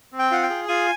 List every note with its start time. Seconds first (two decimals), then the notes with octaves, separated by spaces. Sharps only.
0.12 C4
0.19 G5
0.31 F4 F#5
0.43 G5
0.50 G#4
0.68 F4 G#5